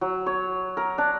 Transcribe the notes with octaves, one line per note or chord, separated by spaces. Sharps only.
F#3
C#5
A#4
D4